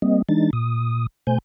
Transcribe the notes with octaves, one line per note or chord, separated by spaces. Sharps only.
G3 A#3 C4 D#5
E3 G#3 D4 D#4 A6
A#2 D#6
B2 A3 C5 G#5 G6